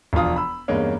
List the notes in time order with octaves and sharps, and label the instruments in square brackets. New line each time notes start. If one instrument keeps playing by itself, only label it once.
[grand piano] E1 F3 D4 F4 D#6
B5 E6
E2 G2 G#3 A#3 C#4